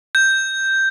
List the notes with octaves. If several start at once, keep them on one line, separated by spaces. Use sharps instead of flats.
G6